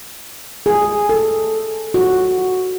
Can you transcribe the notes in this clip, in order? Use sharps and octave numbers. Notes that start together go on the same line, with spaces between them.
G#4
A4
F#4